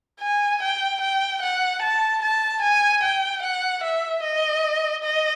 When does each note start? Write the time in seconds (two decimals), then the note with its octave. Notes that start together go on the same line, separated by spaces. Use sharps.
0.21 G#5
0.62 G5
1.01 G5
1.42 F#5
1.82 A5
2.22 A5
2.62 G#5
3.03 G5
3.42 F#5
3.83 E5
4.23 D#5
5.03 D#5